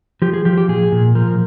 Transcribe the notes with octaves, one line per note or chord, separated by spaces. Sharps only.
F3 G4
G#4
F3 G4
G4
A#2 G#4
A#2
F3 A#4